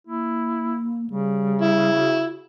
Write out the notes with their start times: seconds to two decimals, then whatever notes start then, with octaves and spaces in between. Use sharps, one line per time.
0.07 A#3 E4
1.10 C#3 G3
1.62 E4
1.96 F#4